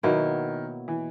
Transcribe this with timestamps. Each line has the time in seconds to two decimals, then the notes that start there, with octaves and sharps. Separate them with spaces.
0.03 B2 D#3 F#3 A#3 E4
0.88 E3